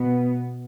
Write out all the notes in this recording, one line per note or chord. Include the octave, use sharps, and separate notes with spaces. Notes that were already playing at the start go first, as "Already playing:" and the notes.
Already playing: B2 B3